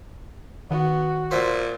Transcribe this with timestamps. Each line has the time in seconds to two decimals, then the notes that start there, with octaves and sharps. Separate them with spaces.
0.71 D#3 B3 F#4
1.31 A#2 C5 E5